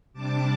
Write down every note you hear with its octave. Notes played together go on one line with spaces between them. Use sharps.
C3 G3 D4 A5 D6